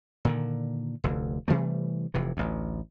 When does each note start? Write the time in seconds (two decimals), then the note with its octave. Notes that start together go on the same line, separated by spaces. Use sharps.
0.25 A#2 D3 D#3
1.04 F1 D2
1.48 C3 E3 G3 A3
2.14 F1 C3 E3
2.37 A1 D2